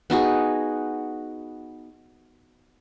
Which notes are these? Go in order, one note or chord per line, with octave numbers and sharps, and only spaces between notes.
B3 D#4 F#4 G#4